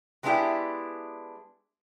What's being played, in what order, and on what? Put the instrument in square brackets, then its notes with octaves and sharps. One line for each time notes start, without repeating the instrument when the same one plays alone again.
[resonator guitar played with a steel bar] F#3 G#3 B3 D4 E4 G4